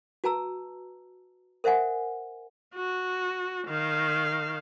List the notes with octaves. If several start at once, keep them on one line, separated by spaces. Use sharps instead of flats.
F#4 B4 A5 A#5 E6
A#4 C5 E5 F#5 G#5
F#4
D#3 F5